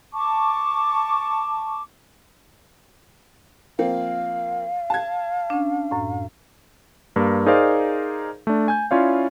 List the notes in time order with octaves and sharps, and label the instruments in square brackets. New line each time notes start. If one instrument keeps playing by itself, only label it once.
[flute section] A5 C#6 D6
[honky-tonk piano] F3 A#3 C4 [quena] F5
[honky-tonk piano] A5 G#6
[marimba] C#4 D4
F#2 A2
[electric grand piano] G2 A#3
D#4 G#4 A#4 C5 D5 F5
A3 D4
G#5 G6
C#4 E4 F4 C#5 D5 F5